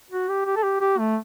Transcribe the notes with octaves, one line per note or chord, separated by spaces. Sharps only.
F#4
G4
G4
A4
G4
G4
A3